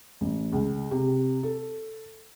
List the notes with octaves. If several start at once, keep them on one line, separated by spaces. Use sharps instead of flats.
A1
C#2
C3
A4